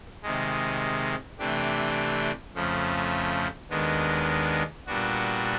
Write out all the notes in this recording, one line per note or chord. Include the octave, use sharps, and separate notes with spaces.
C3 D#3 G#3
C3 E3 A3 D4 G4
F2 C#3 F3 A3
D#2 D#3 G#3 B3 D4
A#2 G3 B3 D4 F#4